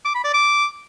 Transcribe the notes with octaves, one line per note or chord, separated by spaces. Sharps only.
D6
B5
D5
D6